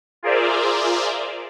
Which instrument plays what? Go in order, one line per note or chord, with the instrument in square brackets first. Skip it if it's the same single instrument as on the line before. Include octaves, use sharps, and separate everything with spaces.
[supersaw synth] F4 G#4 A#4 C5 D5 E5